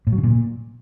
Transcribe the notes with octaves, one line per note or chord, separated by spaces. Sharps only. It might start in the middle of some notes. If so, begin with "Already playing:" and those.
A2
F#3
C#3
A#2